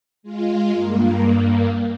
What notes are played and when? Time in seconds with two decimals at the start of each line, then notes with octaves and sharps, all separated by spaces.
0.23 G#3 F4
0.71 G2 A#3